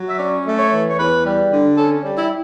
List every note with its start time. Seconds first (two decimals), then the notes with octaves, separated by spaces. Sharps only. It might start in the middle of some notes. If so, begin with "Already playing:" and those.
Already playing: F#3
0.09 E5
0.18 C#4 D5
0.46 A3
0.58 C#5
0.71 E3
0.90 C#5
0.98 E2 B4
1.25 G3
1.52 D3
1.77 C#4 A4
2.03 G3
2.17 E4